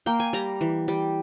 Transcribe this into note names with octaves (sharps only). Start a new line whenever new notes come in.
A#3 G5
G#5
G3 A#5
E3
G3